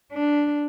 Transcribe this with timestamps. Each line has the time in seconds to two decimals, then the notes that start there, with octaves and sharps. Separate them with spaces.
0.13 D4